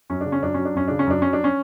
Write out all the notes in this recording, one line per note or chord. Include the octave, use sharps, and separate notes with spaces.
F#2 C#4
C#3 D4
C#4
F#2 D4
F#3 C#4
D4
F#2 C#4
C#3 D4
C#4
F#2 D4
F#3 C#4
D4
C#4